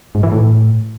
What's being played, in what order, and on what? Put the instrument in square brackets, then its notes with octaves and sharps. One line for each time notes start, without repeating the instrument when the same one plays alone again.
[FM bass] G#2
E3
A2